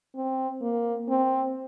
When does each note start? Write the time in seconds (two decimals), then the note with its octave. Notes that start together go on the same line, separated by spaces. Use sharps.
0.15 C4
0.62 A#3
1.09 C4